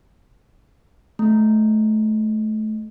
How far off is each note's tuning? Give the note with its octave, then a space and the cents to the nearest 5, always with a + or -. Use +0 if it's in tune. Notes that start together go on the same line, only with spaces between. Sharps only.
A3 -25